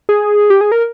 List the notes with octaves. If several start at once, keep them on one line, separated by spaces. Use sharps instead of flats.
G#4
G4
G#4
A#4